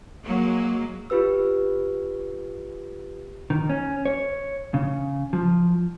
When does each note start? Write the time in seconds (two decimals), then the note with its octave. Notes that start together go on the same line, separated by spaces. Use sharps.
0.24 F#3 G#3 A#3
1.10 F4 G4 B4 E6
3.50 D#3
3.69 C#4
4.05 C#5
4.74 C#3
5.33 F3